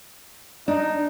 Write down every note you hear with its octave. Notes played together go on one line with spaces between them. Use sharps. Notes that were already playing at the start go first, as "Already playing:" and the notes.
D4 D#4